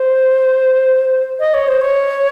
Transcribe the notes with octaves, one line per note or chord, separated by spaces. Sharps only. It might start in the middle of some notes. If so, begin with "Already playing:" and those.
Already playing: C5
D#5
C#5
C5
C#5